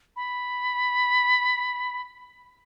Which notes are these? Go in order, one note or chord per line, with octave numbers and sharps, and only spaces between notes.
B5